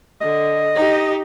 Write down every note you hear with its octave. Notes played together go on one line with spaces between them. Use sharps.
D3 D#5
D#4 G4